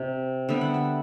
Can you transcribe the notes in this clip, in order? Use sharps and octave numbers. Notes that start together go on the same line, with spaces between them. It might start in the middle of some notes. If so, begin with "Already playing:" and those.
Already playing: C3
D3 G3 B3 E5
F#5
E5